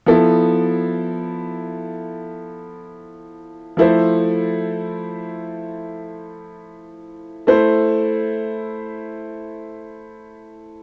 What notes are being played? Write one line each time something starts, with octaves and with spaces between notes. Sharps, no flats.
F3 B3 E4 A4
F3 A3 E4 A4 C5
A3 E4 A4 C5